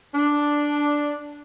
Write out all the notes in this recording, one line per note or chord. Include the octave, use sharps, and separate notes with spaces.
D4